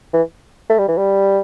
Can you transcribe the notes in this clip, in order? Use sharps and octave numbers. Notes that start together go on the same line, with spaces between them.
E3
A3
G3
E3
G3